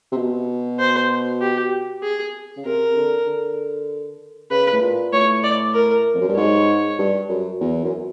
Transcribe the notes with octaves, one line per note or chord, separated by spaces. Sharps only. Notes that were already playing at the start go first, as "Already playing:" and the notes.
C3
B2
C5
G4
G#4
C#3
C3 A#4
D3
D3
C#3 B4
A2
A#2
A2 C#5
D5
A#4
F2
F#2
G2
G#2 C#5
G2
F#2
E2
F#2